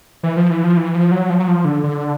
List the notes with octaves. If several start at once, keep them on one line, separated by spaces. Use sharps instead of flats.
E3
F3
E3
F3
E3
F3
F#3
F3
F#3
F3
D3
D3